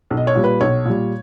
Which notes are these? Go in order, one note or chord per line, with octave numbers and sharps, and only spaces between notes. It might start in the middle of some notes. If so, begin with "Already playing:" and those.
B1
D#5
C#5
A#2 G3
B4
B1 C#5
A#2 G3